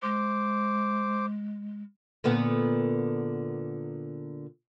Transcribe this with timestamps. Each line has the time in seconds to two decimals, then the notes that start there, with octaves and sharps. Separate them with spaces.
0.03 G#3 C5 D6
2.24 A#2 D3 B3